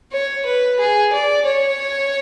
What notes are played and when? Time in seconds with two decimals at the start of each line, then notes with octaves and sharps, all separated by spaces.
0.12 C#5
0.45 B4
0.80 G#4
1.13 D5
1.46 C#5